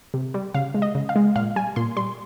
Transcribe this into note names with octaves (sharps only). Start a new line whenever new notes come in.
C3
G3
C#3 F5
G#3
D#5
C#3
F5
G#3
A#2 F5
G3 G#5
A#2 C6
G3 C6